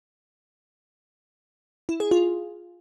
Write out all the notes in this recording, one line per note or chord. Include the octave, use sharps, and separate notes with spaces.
E4
G#4
F4